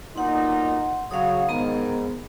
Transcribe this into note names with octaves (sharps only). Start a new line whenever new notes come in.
B1 A#2 D#4 F#5 C6
C#3 F#3 F5 F#5 D#6
G#2 D#3 B3 A#5